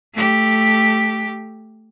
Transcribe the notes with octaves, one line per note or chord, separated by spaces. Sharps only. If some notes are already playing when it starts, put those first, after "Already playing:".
A3 G4